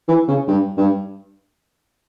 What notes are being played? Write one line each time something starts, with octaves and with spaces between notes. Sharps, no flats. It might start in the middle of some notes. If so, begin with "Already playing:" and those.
E3
C#3
G2
G2